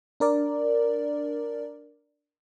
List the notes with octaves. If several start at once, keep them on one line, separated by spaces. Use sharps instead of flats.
D4 A#4 D5